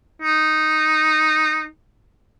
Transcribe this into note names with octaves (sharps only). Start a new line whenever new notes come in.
D#4